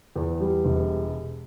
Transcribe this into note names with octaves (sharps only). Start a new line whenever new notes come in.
E2
G3
E1